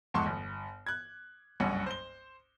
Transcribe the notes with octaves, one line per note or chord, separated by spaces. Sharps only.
F1 E2 G#2 A5 C6 C#6
G1
F#6 G#6
F#1 C2 G2 C#4 F#5
C5 G7